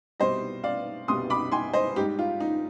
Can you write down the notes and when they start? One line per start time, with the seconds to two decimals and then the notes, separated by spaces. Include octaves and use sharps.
0.20 C2 B2 G3 C5 D#5
0.64 D5 F5
1.08 C2 B2 G3 C6 D#6
1.30 B5 D6
1.52 G#5 C6
1.73 C5 D#5
1.96 G#2 G3 D#4 G4
2.19 F4
2.40 D#4